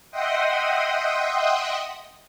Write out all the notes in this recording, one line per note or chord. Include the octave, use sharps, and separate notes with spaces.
D#5 E5 F#5 G5 C6 D#6